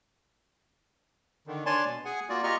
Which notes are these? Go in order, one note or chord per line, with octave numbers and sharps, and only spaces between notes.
D3 D#3
D4 C#5 D5 G#5 A5 C6
B2
G#4 F#5 G#5
A#3 F4 F#4 D5
F4 G4 D#5 A#5 C#6 F6